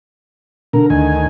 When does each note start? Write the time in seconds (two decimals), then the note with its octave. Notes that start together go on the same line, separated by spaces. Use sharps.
0.73 D3 A#4
0.90 D2 D#3 G#5